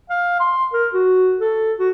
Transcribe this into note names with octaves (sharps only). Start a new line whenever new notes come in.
F5
C6
A#4
F#4
A4
F#4